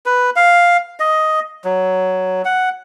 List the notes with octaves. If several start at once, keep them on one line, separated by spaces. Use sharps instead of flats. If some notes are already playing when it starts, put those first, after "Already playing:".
B4
F5
D#5
F#3
F#5